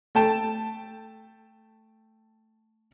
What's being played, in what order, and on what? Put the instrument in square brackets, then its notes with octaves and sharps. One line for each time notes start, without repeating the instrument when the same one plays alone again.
[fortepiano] A3 G5 A5